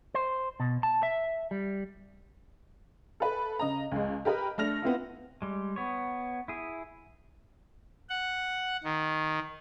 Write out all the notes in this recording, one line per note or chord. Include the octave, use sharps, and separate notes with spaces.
C5
B2
A5
E5
G3
A4 B4
C#3 D#5 A#5
C#2 G#3
G4 A#4 B4 D#5 B5
A3 D4 F6 A#6 F7
B3 C4 E4 F4
G3 G#3
B3 C#5
E4 G#4
F#5
D#3